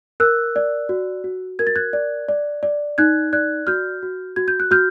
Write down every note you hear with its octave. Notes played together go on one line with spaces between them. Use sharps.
A#4 E6 F#6
D5
F#4
F#4
A#4 G#6
A6
F#6 G#6
D5
D5
D5
D#4 F#6 G#6
D5 F#6 G#6
F#4 F6 G6
F#4
F#4 G#6
G6
F#6
F#4 F6 G6